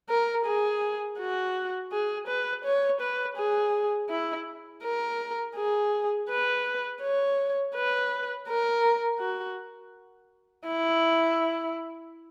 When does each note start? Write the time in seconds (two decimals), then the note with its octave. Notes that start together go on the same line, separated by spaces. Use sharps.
0.09 A#4
0.45 G#4
1.19 F#4
1.92 G#4
2.27 B4
2.64 C#5
3.00 B4
3.37 G#4
4.10 E4
4.84 A#4
5.56 G#4
6.29 B4
7.02 C#5
7.75 B4
8.48 A#4
9.20 F#4
10.67 E4